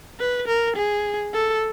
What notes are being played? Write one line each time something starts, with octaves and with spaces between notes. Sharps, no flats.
B4
A#4
G#4
A4